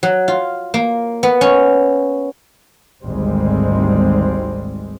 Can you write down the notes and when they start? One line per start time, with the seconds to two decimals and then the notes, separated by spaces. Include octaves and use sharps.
0.03 F#3
0.28 F4
0.74 A#3
1.23 B3
1.41 C#4
3.04 G#1 D2 G3 G#3 C4